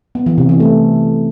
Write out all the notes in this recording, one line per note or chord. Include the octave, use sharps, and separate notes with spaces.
B3
E3
C3
E3
A3